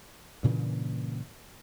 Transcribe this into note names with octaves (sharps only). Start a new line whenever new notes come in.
G2 A#2 C#3 E3